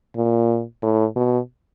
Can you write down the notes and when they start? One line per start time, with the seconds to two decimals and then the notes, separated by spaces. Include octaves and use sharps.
0.17 A#2
0.82 A2
1.16 B2